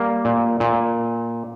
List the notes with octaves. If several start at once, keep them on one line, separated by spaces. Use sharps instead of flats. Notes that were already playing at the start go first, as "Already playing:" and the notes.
Already playing: G3 A#3
A#2
A#2